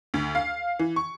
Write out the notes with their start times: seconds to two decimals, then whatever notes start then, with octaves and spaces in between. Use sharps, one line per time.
0.14 D2
0.35 F5
0.79 E3
0.96 C#6